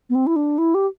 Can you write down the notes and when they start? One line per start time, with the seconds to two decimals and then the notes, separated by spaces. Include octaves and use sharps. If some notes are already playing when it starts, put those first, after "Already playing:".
0.10 B3
0.15 C4
0.27 E4
0.36 D4
0.58 E4
0.74 G4